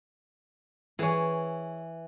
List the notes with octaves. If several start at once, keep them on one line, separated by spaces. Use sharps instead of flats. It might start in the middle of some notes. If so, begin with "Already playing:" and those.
E3 G#4 C#5